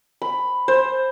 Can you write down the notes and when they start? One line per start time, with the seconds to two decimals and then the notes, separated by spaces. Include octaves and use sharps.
0.22 B5
0.68 C5